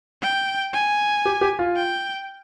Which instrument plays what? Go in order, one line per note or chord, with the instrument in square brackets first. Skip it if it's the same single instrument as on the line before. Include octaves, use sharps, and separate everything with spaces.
[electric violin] G5
G#5
[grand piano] G4
G4
F4
[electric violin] G5